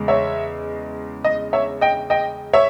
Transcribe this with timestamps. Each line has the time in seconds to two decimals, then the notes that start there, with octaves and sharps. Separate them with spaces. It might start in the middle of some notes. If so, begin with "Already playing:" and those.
Already playing: E2 C#3 G#3
0.08 C#5 E5
1.24 D#5
1.53 C#5 E5
1.81 D#5 G5
2.10 D#5 G5
2.53 C#5 E5